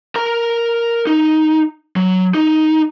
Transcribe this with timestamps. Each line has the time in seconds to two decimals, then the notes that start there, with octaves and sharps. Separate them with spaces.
0.16 A#4 A#5
1.07 D#4
1.96 F#3
2.34 D#4